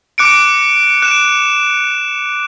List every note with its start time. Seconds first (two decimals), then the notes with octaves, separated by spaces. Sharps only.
0.18 D6 F#6 C#7 D7
1.02 F#6 D7 E7